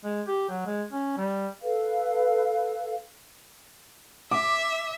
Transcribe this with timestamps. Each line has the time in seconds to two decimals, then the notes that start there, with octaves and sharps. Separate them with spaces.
0.04 G#3
0.27 G4
0.49 F#3
0.66 G#3
0.92 C#4
1.17 G3
1.62 A4 B4 F5
4.31 E5 D6